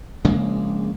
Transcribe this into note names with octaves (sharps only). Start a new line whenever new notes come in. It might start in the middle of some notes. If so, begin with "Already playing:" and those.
A#1 C#3 G#3 A#3